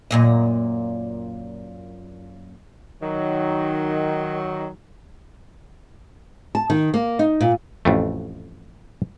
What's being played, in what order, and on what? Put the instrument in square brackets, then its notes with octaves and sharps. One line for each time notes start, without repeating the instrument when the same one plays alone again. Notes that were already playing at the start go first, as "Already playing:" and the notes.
[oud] F#2 A#2 D#5
[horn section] D#3 F#3
[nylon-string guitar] A5
D#3
A#3
D#4
A#2
[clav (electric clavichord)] A1 F2 A3